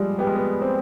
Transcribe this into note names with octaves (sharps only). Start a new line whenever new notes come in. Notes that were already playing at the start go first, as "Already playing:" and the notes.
Already playing: F3 G3 G#3
B3 G4
G#3
B3
C4 C5